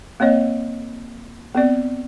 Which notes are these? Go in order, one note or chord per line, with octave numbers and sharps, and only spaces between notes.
A#3 C4 C#5 D#5
B3 C4 D5